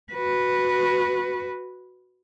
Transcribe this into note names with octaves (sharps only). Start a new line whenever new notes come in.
F#4 B4